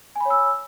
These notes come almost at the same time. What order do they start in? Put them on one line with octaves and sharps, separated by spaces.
G#5 B5 C#5 E6